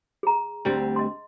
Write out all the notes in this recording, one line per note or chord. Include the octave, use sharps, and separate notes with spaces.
G#4 A#5
D2 G3 C4
D#5 C6